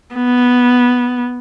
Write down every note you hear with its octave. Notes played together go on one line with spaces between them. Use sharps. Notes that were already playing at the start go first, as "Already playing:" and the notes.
B3